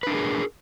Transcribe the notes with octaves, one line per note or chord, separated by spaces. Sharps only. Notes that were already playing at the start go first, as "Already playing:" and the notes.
D4 G#4 A#4 B4